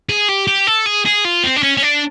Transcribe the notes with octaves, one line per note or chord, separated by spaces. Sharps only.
G#4
G4
G4
A4
G#4
G#4
F4
C4
D4
C#4
C#4
D4